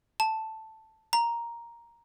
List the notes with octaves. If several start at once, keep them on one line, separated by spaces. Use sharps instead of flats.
A5
A#5